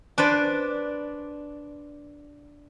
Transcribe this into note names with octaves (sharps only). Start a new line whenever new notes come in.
D4 B4 C5 D5